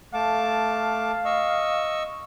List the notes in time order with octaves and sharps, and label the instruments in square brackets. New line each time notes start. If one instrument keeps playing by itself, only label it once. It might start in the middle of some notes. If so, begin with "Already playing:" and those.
[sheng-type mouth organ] A3 A5 D6 [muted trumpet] F5
[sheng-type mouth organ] D#5 C#6 E6